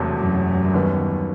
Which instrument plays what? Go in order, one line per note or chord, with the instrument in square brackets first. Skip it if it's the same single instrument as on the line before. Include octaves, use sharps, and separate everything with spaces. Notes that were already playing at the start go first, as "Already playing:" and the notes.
Already playing: [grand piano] E1 E2 C3 F#3 A3
[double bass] F#2
[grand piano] D#2 D#3 G3 B3